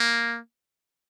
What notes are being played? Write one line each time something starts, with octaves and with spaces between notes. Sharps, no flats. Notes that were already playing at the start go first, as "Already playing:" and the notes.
Already playing: A#3